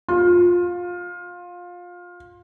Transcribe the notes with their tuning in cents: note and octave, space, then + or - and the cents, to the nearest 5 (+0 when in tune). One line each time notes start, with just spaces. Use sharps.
F4 +20